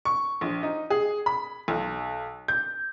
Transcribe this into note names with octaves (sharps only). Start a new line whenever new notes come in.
C#6
A#1
D#4
G#4
B5
B1
G6